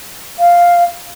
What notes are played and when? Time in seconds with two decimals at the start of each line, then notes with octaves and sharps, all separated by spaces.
0.39 F5